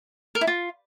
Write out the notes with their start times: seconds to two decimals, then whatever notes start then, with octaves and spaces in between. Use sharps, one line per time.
0.35 A#4
0.41 E4
0.47 F4